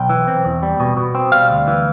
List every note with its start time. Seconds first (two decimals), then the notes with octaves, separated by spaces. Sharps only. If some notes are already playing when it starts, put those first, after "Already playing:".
Already playing: B1 G5
0.10 E3
0.27 C4
0.45 E2
0.63 G3
0.80 B2
0.97 B2
1.15 C4
1.32 G3 F5
1.50 D2
1.67 E3